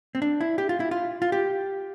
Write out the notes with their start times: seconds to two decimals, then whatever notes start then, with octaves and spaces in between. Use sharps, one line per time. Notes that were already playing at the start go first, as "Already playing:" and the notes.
0.15 C4
0.22 D4
0.41 E4
0.58 G4
0.69 F4
0.80 E4
0.91 F4
1.22 F4
1.32 G4